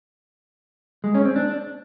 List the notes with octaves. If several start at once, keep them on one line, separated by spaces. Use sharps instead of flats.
G#3
C#4
C4
D4